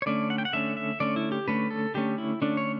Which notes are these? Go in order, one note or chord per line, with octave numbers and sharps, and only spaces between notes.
C#5
D3 A3 C#4 D5
F#5
G5
F#5
D3 A3 C#4 E5
E5
D3 A3 C#4 D5
E4
G4
D3 A3 C#4 B4
A4
D3 A3 C#4 G4
E4
D3 A3 C#4 D4
C#5